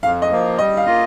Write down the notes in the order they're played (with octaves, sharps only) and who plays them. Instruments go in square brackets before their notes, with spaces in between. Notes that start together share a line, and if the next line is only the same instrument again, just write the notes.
[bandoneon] F2 [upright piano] F5
[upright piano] D#5
[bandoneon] F3 A#3
[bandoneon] G3 [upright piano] D#5
[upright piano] F5
[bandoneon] A#3 F4 D#5